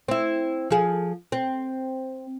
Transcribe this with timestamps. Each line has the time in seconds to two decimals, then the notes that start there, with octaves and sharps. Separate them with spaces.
0.08 C4 E4
0.71 F3 G#4
1.32 C4